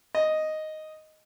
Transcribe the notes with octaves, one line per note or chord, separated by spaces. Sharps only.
D#5